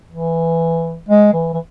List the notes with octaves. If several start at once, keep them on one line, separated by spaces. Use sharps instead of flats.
E3
G#3
E3
E3